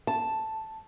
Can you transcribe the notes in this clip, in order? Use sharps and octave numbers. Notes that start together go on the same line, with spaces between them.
A5